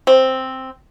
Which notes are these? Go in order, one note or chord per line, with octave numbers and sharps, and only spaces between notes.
C4